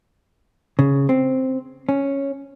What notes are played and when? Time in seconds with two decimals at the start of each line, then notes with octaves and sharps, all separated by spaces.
0.79 C#3
1.09 C4
1.89 C#4